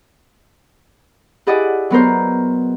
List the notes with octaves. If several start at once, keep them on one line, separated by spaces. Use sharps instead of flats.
E4 G4 G#4 D5 D#5 F#5
F#3 B3 A#4 C5